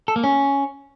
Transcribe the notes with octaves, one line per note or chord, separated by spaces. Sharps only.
A4
A#3
C#4